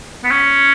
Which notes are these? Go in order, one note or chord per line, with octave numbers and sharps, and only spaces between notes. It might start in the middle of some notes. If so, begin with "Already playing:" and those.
B3
C#4